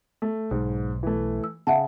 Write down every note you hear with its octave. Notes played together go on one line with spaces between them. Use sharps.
A3
B1 G#2
E3 A3
E6
C#3 E5 F#5 A5